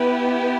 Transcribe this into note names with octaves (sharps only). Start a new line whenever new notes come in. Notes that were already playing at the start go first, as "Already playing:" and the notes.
Already playing: B3 E4 G4 B4